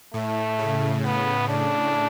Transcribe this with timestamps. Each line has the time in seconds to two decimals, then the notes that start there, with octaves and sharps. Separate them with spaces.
0.13 A2 A3
0.59 C#3
1.04 C#3 B3
1.49 C#3 D4